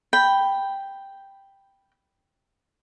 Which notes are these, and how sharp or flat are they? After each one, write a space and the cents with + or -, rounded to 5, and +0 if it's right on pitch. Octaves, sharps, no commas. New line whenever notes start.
G5 +0 B5 +0